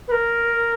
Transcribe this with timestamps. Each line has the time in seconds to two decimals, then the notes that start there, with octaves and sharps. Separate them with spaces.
0.08 B4
0.12 A#4